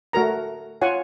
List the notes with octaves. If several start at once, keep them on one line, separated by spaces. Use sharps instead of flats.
A3 F#4 A#4 A#5
F4 C#5 F#5 G#5